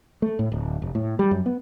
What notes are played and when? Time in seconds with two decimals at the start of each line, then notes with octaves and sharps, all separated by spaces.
0.22 A3
0.39 A2
0.52 D1
0.82 F1
0.95 A2
1.19 G3
1.31 F#2
1.46 B3